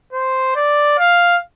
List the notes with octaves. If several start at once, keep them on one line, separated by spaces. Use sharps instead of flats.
C5
D5
F5